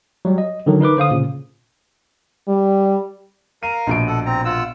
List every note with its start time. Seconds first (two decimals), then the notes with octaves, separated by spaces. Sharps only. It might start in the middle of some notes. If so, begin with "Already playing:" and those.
0.25 F#3 G3
0.38 D#5
0.66 D3 D#3 F#3
0.81 D#4 A#4 B4 D6
0.97 D3 C5 F5 D#6
1.10 A#2 C#3
2.48 G3
3.63 A#4 F5 D#7
3.87 A#1 B2 D7
4.07 A4 F#5
4.26 C4 A#5
4.45 F4 F#5 E6